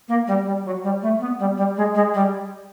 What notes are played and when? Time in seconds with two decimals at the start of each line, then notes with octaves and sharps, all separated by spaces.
0.08 A#3
0.27 G3
0.45 G3
0.65 F#3
0.83 G3
1.02 A3
1.20 B3
1.39 G3
1.57 G3
1.76 G#3
1.95 G#3
2.14 G3